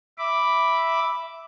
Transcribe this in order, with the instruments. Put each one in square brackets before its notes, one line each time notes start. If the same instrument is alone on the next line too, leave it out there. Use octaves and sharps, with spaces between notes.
[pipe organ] E5 B5 D6